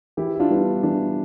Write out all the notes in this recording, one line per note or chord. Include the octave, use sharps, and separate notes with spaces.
E3 E4 G4
E4
D4 F4
G3 B3 D4
E3 D4